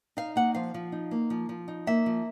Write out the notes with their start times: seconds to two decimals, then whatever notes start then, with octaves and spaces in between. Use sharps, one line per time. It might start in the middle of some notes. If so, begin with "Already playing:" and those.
0.17 D#4 F5
0.36 A#3 F#5
0.55 F3 F5
0.74 F3
0.92 D#4
1.11 A#3
1.30 F3
1.49 F3
1.68 D#4
1.87 A#3 E5
2.06 F3